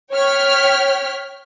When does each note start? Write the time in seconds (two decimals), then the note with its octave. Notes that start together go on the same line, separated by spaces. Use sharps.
0.13 C#5 G5 F6 B6